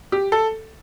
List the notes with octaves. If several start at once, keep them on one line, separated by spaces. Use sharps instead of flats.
G4
A4